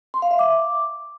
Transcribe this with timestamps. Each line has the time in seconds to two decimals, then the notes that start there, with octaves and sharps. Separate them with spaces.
0.14 C6
0.22 F5
0.31 E5
0.39 D6